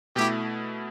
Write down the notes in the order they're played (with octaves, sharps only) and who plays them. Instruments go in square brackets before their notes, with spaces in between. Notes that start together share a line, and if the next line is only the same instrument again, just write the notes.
[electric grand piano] B2 A3 E4 [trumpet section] G4